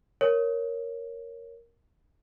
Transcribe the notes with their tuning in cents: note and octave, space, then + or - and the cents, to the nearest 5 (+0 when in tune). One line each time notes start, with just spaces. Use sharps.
A#4 +0 C#5 +0